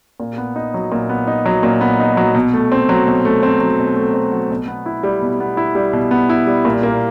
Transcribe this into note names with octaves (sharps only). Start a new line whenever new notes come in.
A#2
B3
D#4
F#3
A#2
B3
D#4
F#3
A#2
B3
D#4
F#3
B2
A3
C4
F#3
B2
A3
C4
F#3
B2
A3
C4
F#3
B2
B3
E4
G3
B2
B3
E4
G3
B2
B3
E4
G3
A#2
A#3